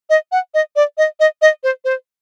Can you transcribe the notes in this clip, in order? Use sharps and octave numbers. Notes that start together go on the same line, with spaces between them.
D#5
F#5
D#5
D5
D#5
D#5
D#5
C5
C5